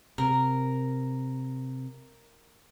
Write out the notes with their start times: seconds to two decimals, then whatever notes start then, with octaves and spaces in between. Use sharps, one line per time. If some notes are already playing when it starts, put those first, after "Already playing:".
0.18 C3 A#4